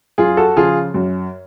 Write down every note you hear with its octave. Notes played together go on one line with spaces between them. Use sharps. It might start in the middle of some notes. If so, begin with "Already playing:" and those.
F#2 F4 G#4
F#4 A4
C#3 F3 F4 G#4
F#2